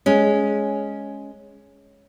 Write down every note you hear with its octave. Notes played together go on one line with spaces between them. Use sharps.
G#3 C#4